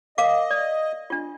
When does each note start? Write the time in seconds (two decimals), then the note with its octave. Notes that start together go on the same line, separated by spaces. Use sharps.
0.18 A#4 D#5 F5 D6
0.50 D5
1.10 D4 F4